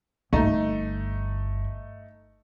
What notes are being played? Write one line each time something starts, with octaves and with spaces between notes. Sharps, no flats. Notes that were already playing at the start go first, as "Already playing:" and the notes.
G1 A3 D#4